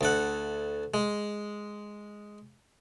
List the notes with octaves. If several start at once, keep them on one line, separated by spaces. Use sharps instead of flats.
D2 A4 F#5
G#3